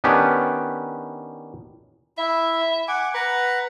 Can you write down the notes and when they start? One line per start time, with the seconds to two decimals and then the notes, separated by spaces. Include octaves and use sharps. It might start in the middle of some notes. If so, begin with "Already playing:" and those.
0.04 D#3 B3 C#4 D4 G4 B4
2.18 E4 E5
2.88 F#5 G#5 D6
3.15 B4 F#5 A#5